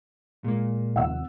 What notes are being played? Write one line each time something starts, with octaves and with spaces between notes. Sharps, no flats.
A#2 G#3 A#3
D#2 C3 F3 F#5 E6